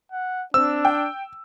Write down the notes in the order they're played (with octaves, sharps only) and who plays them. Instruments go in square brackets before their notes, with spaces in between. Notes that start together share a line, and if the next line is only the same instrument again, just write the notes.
[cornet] F#5
[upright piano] C4 [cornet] D4 [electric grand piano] E6
[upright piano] G5